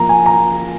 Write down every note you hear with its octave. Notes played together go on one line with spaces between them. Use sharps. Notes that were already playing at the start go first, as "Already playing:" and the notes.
Already playing: F3 A#3 F4 A#5
G#5
A#5